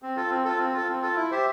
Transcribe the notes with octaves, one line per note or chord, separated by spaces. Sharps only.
C4
F4 A4
C4
F4 A4
C4
F4 A4
C4
F4 A4
E4
G4 C5 E5